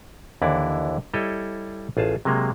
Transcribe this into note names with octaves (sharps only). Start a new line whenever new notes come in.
D#2 D3 E3 E4 D5
G3 E4 A4 C#5 D#5
A1 F4 G#4 A5
C3 F#3 G#3 A#3